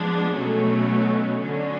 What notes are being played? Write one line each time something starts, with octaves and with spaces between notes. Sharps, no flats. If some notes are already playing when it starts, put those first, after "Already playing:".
Already playing: F3 G#3 B3 D4
B2 F#3 A3 C#4
D3 F#3 C#4